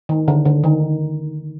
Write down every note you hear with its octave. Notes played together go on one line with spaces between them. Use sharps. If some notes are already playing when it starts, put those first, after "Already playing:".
D#3
D3
D3
D#3